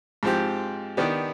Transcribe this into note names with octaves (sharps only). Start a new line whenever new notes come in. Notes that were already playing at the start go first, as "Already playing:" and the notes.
G#2 F3 C4 G4
D#3 B3 D4 G4 B4